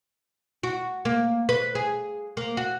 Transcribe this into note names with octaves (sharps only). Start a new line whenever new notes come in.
F#4
A#3
B4
G#4
A#3
F#4